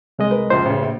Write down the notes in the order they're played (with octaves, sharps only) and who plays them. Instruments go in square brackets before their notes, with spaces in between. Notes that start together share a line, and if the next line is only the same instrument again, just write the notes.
[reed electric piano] C2 G#3 D#5
[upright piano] A#4 B4
[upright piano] F#1 C#2 F3 [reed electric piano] C5
[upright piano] A1 C#3
A#1